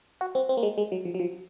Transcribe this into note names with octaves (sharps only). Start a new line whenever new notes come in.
F#4
C4
C4
A#3
G#3
G#3
F#3
F3
F#3
F3